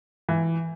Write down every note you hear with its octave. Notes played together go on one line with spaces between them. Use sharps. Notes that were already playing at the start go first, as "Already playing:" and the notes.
E3